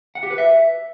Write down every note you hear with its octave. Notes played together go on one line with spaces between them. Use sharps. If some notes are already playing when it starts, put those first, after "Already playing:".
F#5
G4
B4
E5